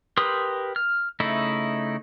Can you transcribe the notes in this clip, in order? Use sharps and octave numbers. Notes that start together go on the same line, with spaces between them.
G4 A#4 B4 C6 D#6
F6
C#3 A3 D#4 E4